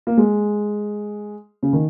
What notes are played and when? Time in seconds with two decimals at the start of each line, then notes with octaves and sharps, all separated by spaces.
0.07 A#3
0.17 G#3
1.63 C#3
1.73 D#3